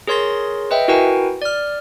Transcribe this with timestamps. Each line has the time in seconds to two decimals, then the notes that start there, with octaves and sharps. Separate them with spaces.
0.07 G#4 A#4 C#5 C6 A6 A#6
0.71 B4 D#5 E5 G5
0.88 E4 F#4 A#4 B4 G5 G#5
1.42 D5 F6